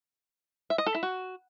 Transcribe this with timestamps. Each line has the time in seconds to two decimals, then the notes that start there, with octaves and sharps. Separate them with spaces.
0.70 E5
0.78 D#5
0.86 A4
0.95 E4
1.03 F#4